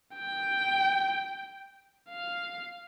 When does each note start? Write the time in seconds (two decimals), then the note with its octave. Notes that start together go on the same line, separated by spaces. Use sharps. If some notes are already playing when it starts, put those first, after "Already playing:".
0.14 G5
2.09 F5